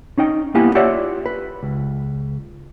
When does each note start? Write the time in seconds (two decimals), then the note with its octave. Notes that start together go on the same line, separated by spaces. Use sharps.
0.18 C#4 D#4 D#5 G5
0.55 A#3 B3 E4 G4 G#5
0.75 F4 G4 C#5 D5 E5 F#5
1.26 B4
1.63 C#2